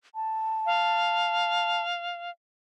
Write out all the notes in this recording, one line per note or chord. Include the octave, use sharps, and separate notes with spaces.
A5
F5